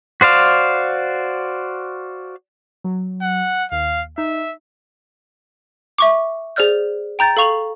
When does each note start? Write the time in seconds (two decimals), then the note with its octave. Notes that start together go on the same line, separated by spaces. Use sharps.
0.21 F#4 C5 D5 F5
2.84 F#3
3.22 F#5
3.72 D#2 F5
4.18 D#4 E5
5.98 E5 C#6 D6
6.56 G#4 C5 D5 F6 G6
7.19 G5 A#5 G6 A6
7.37 A4 F5 C#6 F7 F#7